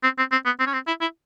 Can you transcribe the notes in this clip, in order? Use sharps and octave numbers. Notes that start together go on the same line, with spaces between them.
C4
C4
C4
B3
C4
C#4
C4
E4
E4